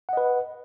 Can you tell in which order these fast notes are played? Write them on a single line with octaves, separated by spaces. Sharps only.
F#5 D#5 B4